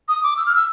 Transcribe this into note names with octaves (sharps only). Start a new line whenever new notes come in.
D#6
D6
E6
F6
E6